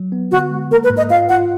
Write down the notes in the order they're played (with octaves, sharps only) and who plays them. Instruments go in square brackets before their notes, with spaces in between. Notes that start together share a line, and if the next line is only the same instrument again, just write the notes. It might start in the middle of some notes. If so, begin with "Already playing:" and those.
Already playing: [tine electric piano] F#3
B3
[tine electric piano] D3 [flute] F#4
[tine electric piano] G#3
[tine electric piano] A#3 [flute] A#4
[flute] B4
[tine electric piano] G#2
[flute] D#5
[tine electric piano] F4 [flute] F5
[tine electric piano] F4 [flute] F#5